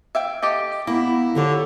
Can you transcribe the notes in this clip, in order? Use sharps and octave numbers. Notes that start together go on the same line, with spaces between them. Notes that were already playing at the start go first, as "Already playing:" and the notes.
E5 F5 G5
G4 A4 D#5
A#3 B3 E4
D3 F4 G4 C#5